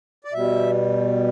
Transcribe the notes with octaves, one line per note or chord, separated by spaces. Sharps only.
D5
B2 G3 E5